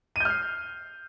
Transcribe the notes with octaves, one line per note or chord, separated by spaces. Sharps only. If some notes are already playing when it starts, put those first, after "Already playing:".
F6 G6 C7 D#7